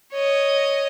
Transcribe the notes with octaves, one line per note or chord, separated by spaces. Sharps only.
C#5 D#5